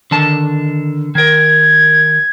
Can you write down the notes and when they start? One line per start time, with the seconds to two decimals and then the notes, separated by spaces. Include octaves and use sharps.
0.11 D3 D#3 A5
1.15 D#3 A#4 G#6